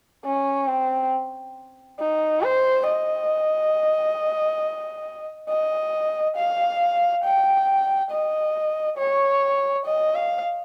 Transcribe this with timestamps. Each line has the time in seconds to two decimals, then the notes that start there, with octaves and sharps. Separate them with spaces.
0.25 C#4
0.68 C4
2.00 D#4
2.42 C5
2.87 D#5
5.49 D#5
6.36 F5
7.24 G5
8.11 D#5
8.98 C#5
9.86 D#5
10.15 F5